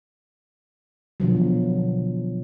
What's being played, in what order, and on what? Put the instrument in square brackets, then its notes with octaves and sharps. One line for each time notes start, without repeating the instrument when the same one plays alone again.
[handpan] B2 D3 F3 F#3